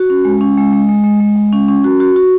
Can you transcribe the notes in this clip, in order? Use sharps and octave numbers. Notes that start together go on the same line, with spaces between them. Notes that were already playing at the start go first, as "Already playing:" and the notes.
Already playing: F#4
C#4
G#3
C#4
G#3
G#3
G#3
G#3
G#3
G#3
C#4
C#4
F#4
F#4
F#4